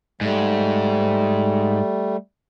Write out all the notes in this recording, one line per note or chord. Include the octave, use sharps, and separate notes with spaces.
G#2 G3 A3